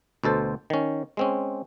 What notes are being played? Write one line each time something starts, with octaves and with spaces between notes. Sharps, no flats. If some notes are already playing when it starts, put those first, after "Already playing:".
D2 B2 A4 C5
D#3 C#4
G#3 C4 C#4